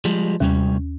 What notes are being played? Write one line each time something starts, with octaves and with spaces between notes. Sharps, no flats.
F3 G3 G#3
D#2 C3 G3 C#4